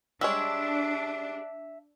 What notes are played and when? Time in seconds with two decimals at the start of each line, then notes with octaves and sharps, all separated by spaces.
0.21 G3 G#3 D4 C#5 E5